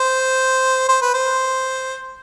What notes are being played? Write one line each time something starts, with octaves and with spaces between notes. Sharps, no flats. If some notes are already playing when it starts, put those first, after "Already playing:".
Already playing: C5
C5
B4
C5